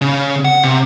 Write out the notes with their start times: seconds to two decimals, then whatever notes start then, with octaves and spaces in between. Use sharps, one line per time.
0.01 C#3
0.45 F#5
0.64 C3